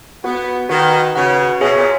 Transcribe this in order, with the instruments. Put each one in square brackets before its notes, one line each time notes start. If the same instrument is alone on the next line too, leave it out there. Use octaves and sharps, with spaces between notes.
[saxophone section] B3 [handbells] F#4 B4 F#5
[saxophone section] D#3 [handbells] F#4 B4 F#5
[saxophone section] C#3 [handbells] F#4 B4 F#5
[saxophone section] B2 [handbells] G#4 C#5 E5 G#5
[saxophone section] A#2